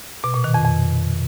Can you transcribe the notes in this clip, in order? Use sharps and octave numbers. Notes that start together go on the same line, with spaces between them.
B2
A#2
D#3
F2
F2